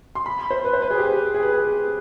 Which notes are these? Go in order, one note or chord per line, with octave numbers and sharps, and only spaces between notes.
C6
B5
C5
B4
C5
B4
G#4
G4
G#4
B4
G#4